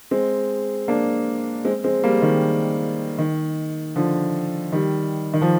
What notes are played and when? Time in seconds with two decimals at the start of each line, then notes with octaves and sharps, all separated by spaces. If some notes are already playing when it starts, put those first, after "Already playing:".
0.11 G#3 C4
0.88 A#3 D4
1.65 G#3 C4
1.84 G#3 C4
2.03 G3 A#3
2.22 D#3
3.19 D#3
3.96 D3 F3
4.72 D#3 G3
5.34 D#3
5.42 F3